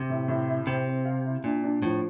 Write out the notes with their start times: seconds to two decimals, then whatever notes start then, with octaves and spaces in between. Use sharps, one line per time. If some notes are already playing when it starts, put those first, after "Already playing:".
Already playing: C3
0.10 A2
0.28 A2
0.48 E4
0.67 C3 C4
0.87 C4
1.05 F5
1.25 E4
1.44 A#2 D4
1.64 D4
1.82 A2 F3